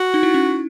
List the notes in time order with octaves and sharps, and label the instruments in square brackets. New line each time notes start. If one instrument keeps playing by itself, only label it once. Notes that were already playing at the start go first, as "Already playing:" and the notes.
Already playing: [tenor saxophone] F#4
[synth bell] D#4
E4
C#4